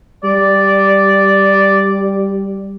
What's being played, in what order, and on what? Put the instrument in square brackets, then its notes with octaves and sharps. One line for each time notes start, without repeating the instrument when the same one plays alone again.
[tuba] G3 [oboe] D5